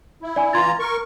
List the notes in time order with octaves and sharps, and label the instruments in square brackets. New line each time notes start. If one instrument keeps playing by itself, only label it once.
[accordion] E4
[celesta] D5 G#5
[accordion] E3 F4 A#5 [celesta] C6 G#6 A6
[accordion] A#4 C#6